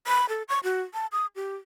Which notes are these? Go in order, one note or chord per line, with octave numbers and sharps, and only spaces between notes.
B5
A4
C#6
F#4
A5
D#6
G4